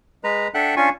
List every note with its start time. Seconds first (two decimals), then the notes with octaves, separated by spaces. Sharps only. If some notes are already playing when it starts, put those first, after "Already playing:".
0.24 G#3 B4 A#5
0.54 D4 A4 E5 F#5 G5 F#6
0.77 C#4 D4 F4 G#5 C#6